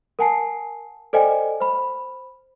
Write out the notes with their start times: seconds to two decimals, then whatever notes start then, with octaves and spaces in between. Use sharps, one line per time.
0.19 A#4 F#5 G#5 A5 C7
1.13 A4 C5 D5 D#5 G5 G#5
1.60 C5 B5